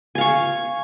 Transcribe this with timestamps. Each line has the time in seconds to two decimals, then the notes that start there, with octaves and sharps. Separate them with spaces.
0.15 G#5
0.18 F5
0.21 C#6